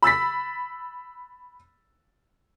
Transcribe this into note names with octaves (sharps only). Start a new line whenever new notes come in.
B5 E6 A6 B6